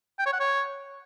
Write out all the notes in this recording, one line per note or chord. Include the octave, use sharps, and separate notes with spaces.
G5
C#5
F#5
C#5